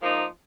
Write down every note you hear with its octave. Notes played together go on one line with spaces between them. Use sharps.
G#2 F3 A#3 D#4